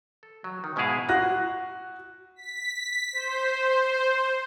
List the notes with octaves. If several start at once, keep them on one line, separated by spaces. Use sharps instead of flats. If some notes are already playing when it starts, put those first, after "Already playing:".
A4
F#3
D#3
G#2 B2 G#3 E4 G#4 F5
F#4 F#6 A#6
B6
C5